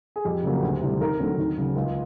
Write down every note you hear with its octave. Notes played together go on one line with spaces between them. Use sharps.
G#4
F2 G4
C#3 F#3 A#3
D2
C3 E3 G3
D#2 A#4
D3 F#3 A3 C4
D#2
C#3 F#3
C#2 F4